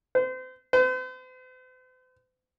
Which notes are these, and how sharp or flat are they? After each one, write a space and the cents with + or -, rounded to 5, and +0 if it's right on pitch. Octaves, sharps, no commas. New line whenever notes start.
C5 -35
C5 -45